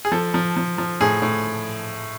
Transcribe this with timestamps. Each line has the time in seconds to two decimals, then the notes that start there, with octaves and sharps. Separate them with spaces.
0.05 G#4
0.12 F3 A4
0.34 F3
0.57 F3
0.78 F3
1.01 A2 G#4
1.22 A2